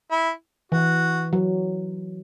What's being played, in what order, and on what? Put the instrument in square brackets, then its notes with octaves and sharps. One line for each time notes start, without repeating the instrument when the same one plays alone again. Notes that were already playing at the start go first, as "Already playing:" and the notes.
[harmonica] E4
[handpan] E3 [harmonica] F#4
[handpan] F#3